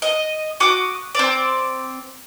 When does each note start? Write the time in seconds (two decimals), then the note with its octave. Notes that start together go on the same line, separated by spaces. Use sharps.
0.02 D#5
0.60 F#4 D6 D#6
1.15 C4 D5